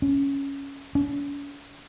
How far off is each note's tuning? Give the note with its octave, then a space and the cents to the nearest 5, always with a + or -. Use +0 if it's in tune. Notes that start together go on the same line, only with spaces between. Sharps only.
C#4 +5
C#4 +45